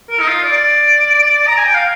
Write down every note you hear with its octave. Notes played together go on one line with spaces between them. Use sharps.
A#4
D#4
F4
D5
A#5
G#5
G5
F5